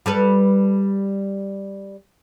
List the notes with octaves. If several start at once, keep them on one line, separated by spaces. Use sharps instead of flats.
G3 A4 B4